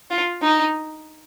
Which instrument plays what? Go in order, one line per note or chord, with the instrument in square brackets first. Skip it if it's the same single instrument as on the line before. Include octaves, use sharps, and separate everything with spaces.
[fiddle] F4
D#4